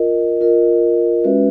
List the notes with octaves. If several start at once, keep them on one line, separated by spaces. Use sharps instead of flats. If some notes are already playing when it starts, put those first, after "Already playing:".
Already playing: F4 A#4 D#5
F4 A#4 D#5
G#3 C#4 F#4 B4 E5